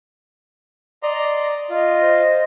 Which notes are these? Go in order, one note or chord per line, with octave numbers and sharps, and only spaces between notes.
D5 D#5 A#5 C6
F4 D#5
C5